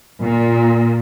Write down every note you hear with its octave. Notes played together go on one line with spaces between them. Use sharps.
A#2